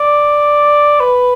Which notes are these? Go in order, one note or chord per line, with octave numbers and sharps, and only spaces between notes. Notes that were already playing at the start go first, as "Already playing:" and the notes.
Already playing: D5
B4